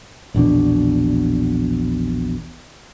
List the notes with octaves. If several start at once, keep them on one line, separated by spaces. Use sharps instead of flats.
A#1 E2 B2 D4